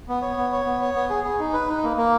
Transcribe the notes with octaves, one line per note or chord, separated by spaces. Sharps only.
B3
C#5
B3
C#5
B3
C#5
B3
G#4
G#4
D#4
B4
D#4
A#3
A#3